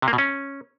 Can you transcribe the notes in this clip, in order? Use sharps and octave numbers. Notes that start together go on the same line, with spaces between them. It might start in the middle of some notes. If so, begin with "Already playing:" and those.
C3
A#3
B2
C#4